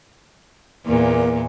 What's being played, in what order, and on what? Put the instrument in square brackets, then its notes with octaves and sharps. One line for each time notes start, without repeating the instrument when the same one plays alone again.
[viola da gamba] E2 A#2 [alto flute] A#3